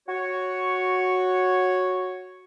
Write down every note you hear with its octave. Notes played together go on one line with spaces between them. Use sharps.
F#4 C#5